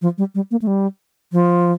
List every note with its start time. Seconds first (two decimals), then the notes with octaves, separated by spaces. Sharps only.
0.02 F3
0.18 G3
0.35 G3
0.51 A#3
0.62 A3
0.67 G3
1.33 F3